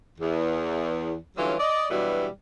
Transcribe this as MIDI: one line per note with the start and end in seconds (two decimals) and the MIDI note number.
0.19 1.15 40
1.36 1.53 50
1.36 1.53 52
1.36 1.53 54
1.36 1.53 55
1.36 1.53 61
1.36 1.53 65
1.58 1.86 74
1.58 1.86 75
1.89 2.27 43
1.89 2.27 47
1.89 2.27 52
1.89 2.27 54
1.89 2.27 55